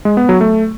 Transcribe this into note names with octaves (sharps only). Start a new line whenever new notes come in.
G#3
B3
F#3
A3